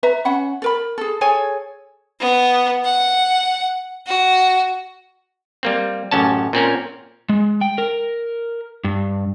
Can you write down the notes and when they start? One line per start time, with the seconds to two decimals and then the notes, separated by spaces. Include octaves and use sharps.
0.03 B4 E5 A#5
0.25 C#4 F#5 B5
0.62 A4 A#4 B5
0.98 G#4 A4
1.21 G#4 A4 C#5 G#5
2.20 B3
2.85 F#5
4.07 F#4
5.63 G3 A#3 C4
6.11 A1 F#2 C#4 A5
6.53 A#2 C4 C#4 A#4
7.29 G#3
7.61 G5
7.78 A#4
8.84 G2